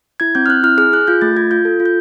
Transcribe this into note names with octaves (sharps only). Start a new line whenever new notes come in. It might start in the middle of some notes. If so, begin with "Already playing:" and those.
E4 G#6
C4 G6
F6
C4 F#6
E4 F6
G#4 F6
G#4 F#6
F4 G6
A3 A6
F4 G#6
F4 G6
A4
F4
G6